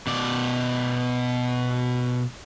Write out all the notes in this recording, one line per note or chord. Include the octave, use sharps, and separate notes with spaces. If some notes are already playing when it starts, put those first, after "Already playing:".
B2 D5